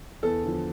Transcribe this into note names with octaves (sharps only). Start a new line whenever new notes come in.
E2 A4
D3 F3